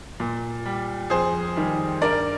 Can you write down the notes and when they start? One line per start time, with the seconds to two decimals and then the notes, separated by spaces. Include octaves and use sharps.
0.20 A#2
0.66 G3
1.10 F2 G#4 C5
1.56 D#3 G3
2.02 G2 A#4 D5